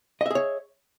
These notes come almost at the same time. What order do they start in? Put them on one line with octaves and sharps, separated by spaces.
D#5 E5 G#4 C#5